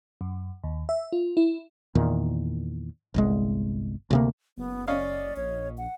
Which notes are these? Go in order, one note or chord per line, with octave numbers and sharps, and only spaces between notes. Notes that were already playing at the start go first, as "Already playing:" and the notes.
F#2
D#2
E5
F4
E4
E2 A#2 D#3
G1 C2 G#3
D2 C3 A#3
F#1 B3
C#4 D5 D#5 F5
A#1 C#5
F#5